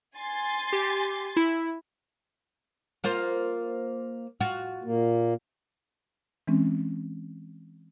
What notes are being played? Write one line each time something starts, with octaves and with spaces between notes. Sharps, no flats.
G#5 C6 A6
G4
E4
A#3 F4 C5
F4 F#4
A#2 A#3
E3 G#3 C4 C#4